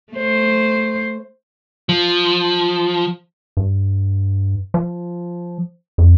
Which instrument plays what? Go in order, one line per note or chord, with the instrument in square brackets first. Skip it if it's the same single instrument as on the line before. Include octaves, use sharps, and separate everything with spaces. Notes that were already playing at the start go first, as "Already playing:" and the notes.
[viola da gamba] A3 C5
[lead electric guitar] F3
[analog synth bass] G2
F3
F2